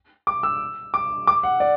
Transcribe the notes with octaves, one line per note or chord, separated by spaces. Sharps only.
D6
E6
D6
D6
F#5
D5